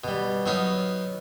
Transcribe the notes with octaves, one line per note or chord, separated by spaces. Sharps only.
B2 G3
F#3 B3 D#4 C#5 F5